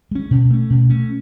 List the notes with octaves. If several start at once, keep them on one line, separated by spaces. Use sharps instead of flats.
G#3 C#4
B2
A3 C#4
B2
A3 C#4